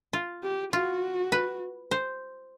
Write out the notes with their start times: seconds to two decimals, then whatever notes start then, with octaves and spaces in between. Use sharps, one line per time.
0.13 F4
0.43 G4
0.73 F4 F#4
1.32 B4
1.91 C5